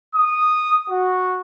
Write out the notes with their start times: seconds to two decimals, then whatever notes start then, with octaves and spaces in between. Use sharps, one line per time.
0.16 D#6
0.90 F#4